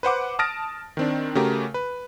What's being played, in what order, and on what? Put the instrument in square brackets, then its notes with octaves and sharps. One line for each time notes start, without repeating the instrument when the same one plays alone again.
[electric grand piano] B4 C5 F#5 D6
A5 D#6 F6 A6 A#6 D7
D#3 C4 D4
C#3 A3 F#4 G4 A#4
B4